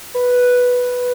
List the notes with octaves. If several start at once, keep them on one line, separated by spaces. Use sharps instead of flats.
B4